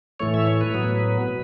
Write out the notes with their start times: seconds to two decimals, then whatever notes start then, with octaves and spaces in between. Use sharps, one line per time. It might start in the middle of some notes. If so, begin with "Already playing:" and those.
0.20 A2 E3 A3 C#5
0.34 E5
0.47 C#5
0.61 B4
0.74 A2 F#3 B3
1.28 B2